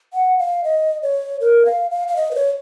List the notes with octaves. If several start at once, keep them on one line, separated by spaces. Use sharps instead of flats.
F#5
F5
D#5
C#5
A#4
F5
F5
F5
D#5
B4
C#5